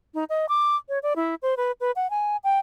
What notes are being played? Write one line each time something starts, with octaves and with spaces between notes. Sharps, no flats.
D#4
D#5
D6
C#5
D5
E4
C5
B4
B4
F#5
G#5
G5